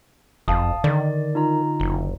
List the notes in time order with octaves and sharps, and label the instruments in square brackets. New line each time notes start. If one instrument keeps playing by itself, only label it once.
[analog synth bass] F#1 [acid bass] F2 [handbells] F5 A5 D#6
[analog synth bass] D3 [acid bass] D#3 [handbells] D5
[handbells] D#4 F4 A#5
[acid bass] F#1